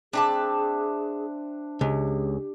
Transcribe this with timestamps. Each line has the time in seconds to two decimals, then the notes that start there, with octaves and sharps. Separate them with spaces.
0.13 C4 D4 G#4 E5 A5
1.81 C#2 G4